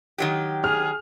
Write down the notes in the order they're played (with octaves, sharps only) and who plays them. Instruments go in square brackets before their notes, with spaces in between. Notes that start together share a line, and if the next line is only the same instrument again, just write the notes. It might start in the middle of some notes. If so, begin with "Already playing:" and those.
[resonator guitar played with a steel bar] D#3 F#3 G4
[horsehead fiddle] G#4 [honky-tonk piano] F6